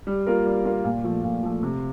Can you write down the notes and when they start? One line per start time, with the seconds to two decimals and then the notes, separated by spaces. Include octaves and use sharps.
0.07 G3
0.27 A#3 F4 A#4
0.45 G3
0.65 A#3 F4 A#4
0.85 A#2
1.04 F3 A3
1.24 A#2
1.43 F3 A3
1.63 C3